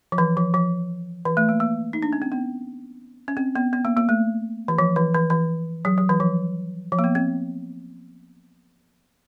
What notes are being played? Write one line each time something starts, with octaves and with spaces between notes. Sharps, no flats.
F3
E3
F3
F3
E3
A3
A#3
A#3
D#4
D4
C#4
C4
B3
C#4
C4
B3
B3
A#3
A#3
A3
E3
F3
E3
E3
E3
F#3
F#3
E3
F3
F3
A#3
B3
C4